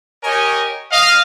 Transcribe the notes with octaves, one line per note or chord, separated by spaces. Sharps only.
G4 A#4 C#5 D#5 G#5
D#5 F5